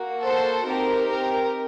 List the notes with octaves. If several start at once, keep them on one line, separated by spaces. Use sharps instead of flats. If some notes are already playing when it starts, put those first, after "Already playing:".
Already playing: A#3 F#4
A4 C5
C4 D#4 G4 A#4
A#4